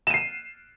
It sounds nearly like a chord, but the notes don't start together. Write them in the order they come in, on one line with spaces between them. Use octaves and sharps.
E7 D#7 C7